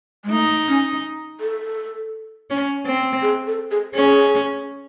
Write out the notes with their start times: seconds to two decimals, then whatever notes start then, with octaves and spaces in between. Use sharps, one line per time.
0.24 G#3
0.31 A3 D#4
0.68 C#4
1.40 A4
2.50 C#4
2.86 C4
3.22 G#4
3.47 A4
3.71 G#4
3.95 C#4 G#4